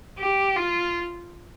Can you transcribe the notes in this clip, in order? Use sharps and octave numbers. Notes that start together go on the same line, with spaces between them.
G4
F4